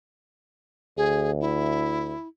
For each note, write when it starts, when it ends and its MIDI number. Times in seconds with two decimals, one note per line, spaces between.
0.97 2.13 38
0.97 1.30 68
1.41 2.28 64